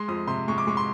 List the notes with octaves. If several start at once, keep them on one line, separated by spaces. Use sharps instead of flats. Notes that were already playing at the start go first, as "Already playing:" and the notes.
Already playing: G#3 C6
F2 D#6
C3 C6
G#3 C#6
D6
G#3 C#6
C6